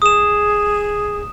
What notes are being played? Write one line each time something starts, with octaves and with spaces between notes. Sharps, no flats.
G#4 D#6 E7